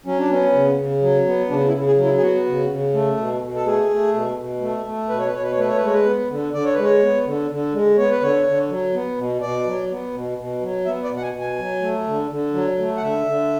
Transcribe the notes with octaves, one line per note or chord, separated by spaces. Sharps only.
F#3 C#4
D4
B3 C#4
C#3
C#3
F#3
B3
C#3 D4
E4
C#3
G#4
F#3
E4
G#4
B3 F#4
C#3
C#3
A3
B2
B2
A4
A3 G#4
A3
B2
B2
A3
A3
B2 B4
C#5
B4
B2 C#5
B4
C#5
A3 B4
C#5
B4
G#3 C#5
B4
B3
D3
D3 D5
C#5
G#3 B4
C#5
B3
D3
D3
G#3
B3 C#5
B4
D3 C#5
D3
F#3
B3
B2
B2 D5
F#3
B3
B2
B2
F#3
B3 E5
D5
B2
F#5
G#5
B2
G#5
F#3
A3
D3
D3
F#3
A3
F#5
D3 E5
D3